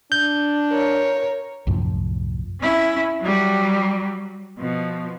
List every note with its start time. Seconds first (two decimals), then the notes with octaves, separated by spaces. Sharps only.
0.12 D4 G6
0.71 A#4 C#5
1.67 C2 F#2 A2 F3
2.61 C#4 E4
3.21 F#3 G3
4.58 B2 F3